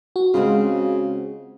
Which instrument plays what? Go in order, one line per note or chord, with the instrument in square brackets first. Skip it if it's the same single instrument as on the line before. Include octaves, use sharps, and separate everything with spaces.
[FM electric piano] F#4
[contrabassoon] C#3 [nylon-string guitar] G#3 C4 F4